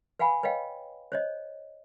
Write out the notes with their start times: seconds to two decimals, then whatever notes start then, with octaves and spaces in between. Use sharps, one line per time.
0.19 B4 F5 F#5 G#5 B5
0.43 B4 C#5 D#5 F5 G5
1.12 C5 C#5 D#5